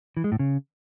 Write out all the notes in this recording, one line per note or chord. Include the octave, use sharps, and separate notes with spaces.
E3
G#3
A2
C#3